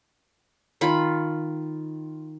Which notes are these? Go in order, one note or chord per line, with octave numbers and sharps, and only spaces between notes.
D#3 F4 B5